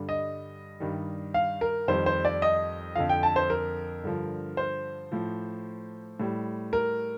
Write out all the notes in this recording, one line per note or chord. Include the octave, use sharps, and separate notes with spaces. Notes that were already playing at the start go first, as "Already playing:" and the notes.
Already playing: G2 D3 G3
D#5
G2 D#3 G3
F5
A#4
F2 D#3 G3 C5
C5
D5
D#5
F2 D3 F3 F5
G5
A5
C5
A#4
G2 D3 F3
C5
A2 F3
A2 G3
A#4